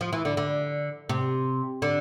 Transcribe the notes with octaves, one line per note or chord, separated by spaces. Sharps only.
F3
E3
D3
D3
C3
D3